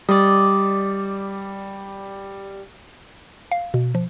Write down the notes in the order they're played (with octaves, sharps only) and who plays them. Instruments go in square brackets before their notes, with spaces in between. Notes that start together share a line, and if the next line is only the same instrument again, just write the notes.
[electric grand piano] G3 [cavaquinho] D5 D#5
[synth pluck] F5
B2
F3